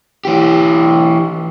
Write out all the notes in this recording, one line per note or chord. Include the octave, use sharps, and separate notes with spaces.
E3 G4